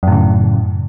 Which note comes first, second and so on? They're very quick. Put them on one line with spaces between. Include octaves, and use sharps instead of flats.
F#2 A2 C#3